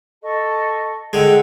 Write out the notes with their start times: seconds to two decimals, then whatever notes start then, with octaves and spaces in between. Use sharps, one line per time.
0.21 A4 D#5 C#6
1.13 D3 G#3 F#5 G5 E6